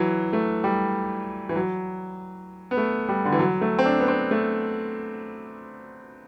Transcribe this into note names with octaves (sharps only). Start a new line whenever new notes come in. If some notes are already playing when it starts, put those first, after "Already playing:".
Already playing: E3 F#3
A3
G3
E3
F#3
B3
A3
G3
D3
E3
F#3
A3
C4
D4
B3
C4
A3